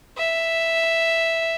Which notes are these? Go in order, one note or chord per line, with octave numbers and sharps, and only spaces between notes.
E5